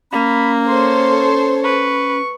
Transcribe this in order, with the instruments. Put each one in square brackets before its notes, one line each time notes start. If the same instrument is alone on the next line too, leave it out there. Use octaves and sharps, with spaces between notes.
[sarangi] A#3 [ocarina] C#4 [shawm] B5
[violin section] A4 C5 C#5 [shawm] C6
[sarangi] B4 [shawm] C#6